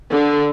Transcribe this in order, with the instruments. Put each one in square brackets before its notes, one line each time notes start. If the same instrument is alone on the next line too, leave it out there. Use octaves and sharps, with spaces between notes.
[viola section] D3